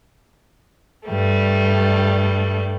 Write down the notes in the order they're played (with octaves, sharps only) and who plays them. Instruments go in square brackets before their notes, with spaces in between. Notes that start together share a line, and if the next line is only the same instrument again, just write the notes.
[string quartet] G2 G3 A3